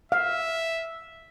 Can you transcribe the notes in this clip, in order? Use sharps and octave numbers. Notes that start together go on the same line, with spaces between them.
E5 F5